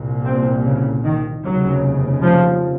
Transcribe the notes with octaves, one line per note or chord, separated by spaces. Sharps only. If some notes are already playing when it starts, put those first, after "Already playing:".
Already playing: C2 A#2
C4
C#3
D#3
F1 D#2 C#3 F#3
F3